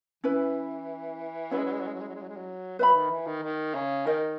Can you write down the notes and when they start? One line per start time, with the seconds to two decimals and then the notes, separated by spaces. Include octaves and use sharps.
0.24 E3 C#4 E4 B4
1.51 F#3 C#4 E4 B4
1.58 G#3
1.65 F#3
1.73 G#3
1.80 F#3
1.87 G#3
1.94 F#3
2.01 G#3
2.08 F#3
2.15 G#3
2.22 F#3
2.29 G#3
2.36 F#3
2.79 F#3 B4 E5 B5
2.94 D#3
3.10 E3
3.27 D#3
3.43 D#3
3.74 C#3
4.06 D#3 D#4 A#4 D#5